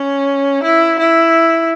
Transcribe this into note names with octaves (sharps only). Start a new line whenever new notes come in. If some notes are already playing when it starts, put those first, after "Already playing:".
Already playing: C#4
E4
E4